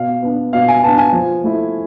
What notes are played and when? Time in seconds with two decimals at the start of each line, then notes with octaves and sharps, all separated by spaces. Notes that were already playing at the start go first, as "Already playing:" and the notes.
Already playing: B2 F5
0.22 B3 D4
0.53 B2 F5
0.68 G#5
0.83 B3 D4 A5
0.98 G#5
1.13 F3
1.44 A3 E4